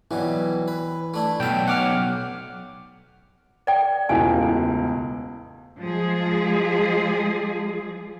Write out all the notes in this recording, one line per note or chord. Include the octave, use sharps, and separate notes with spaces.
B2 E3 F#3 G3
B4
A3 D4 E4
B1 F#3 E5 G5
C#4 F#5 D6 F6
D5 G5
E1 C#2 A2 G#5
F3 G#3 G#4